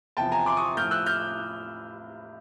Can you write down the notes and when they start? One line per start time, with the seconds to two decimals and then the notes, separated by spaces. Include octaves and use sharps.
0.17 E2 C3 F3 G5 A5
0.32 G#5 A#5
0.46 C6 D6
0.57 C#6 D#6
0.77 A2 F3 F6 G6
0.91 E6 F#6
1.06 F6 G6